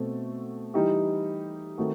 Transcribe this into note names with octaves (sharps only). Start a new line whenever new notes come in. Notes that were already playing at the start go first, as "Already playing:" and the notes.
Already playing: B2 A3 C4 F#4 A4
E3 G3 D#4 G4
D#3 A3 C4 F#4 A4